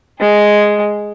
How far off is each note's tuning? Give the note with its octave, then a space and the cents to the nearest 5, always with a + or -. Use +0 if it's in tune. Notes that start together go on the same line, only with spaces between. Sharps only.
G#3 +0 G#4 +0